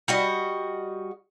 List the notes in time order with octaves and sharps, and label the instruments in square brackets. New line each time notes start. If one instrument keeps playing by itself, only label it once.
[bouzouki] G3 F#4 D#5